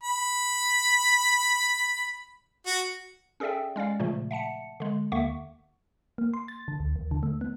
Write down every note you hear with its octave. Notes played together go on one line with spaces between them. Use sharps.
B5
F#4
C#4 G#4 A4 D5 E5 G5
G#3 C#4 D5 F5
A#2 C#3 F3 A3
E5 F#5 A5 C#7
D3 G#3
D#2 D3 A#3 E5 F#5 C#6
A#3
C6
A6
D3
D2
D#2
D3
A3
B3